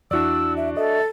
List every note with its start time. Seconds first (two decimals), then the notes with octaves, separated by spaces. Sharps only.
0.11 E2 D4 E4 F#4 D5 E6
0.57 E5
0.77 A4 D#5 E5